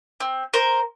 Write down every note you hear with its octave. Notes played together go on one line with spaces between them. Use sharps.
C4
A#4 C5